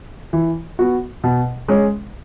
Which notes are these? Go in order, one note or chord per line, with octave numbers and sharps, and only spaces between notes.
E3
B3 F#4
B2
G#3 C#4